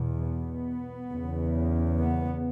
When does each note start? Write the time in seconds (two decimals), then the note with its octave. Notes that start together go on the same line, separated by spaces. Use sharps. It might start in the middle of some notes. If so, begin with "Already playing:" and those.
Already playing: E2 B2
0.20 B3
1.10 E2 C#3
2.01 B3